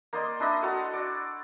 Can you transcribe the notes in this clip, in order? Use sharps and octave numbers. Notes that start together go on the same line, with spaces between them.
A#3 C5 D5 D#5
D4 E4 C5 D#5
F#4 A4 A5 A#5
D5